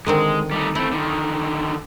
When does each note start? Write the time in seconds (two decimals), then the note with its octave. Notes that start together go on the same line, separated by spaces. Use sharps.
0.07 D3 D#3 G#3 C4
0.51 G3 A3 D#4
0.75 A3 C4 E4
0.92 D3 D#3